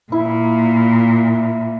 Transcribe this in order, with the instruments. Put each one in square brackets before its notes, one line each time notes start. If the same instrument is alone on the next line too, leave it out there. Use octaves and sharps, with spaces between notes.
[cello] A#2 [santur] E4